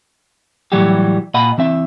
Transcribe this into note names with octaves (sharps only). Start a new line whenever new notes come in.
A2 E3 F#3 G3 F#4 G4
A#2 D#5 F#5 B5
E3 C4 E5